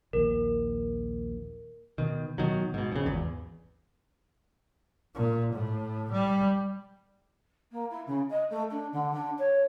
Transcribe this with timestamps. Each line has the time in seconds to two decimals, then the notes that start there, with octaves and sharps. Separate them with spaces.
0.13 A#1 D#2 A#4
1.98 B2 D#3
2.38 B2 D#3 F#3
2.74 G#2 B2
2.92 F2 C#3
3.06 G#1 E2
5.15 A#2
5.54 A2
6.12 G3
7.72 A#3
7.90 E4
8.07 C#3
8.30 D#5
8.50 A3
8.71 D4
8.92 D3
9.13 D4
9.38 C#5